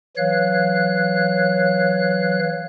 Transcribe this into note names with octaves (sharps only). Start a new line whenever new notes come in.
E3 F#3 C#5 F5 F#6